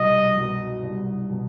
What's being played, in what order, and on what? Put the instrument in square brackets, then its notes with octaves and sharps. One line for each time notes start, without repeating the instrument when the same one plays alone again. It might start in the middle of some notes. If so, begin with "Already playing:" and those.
Already playing: [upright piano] C2 B2 F#3 [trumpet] D#5
[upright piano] B2 F#3
C2
B2 F#3